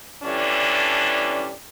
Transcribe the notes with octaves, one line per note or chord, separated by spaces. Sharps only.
D3 E3 G3 C#4 D4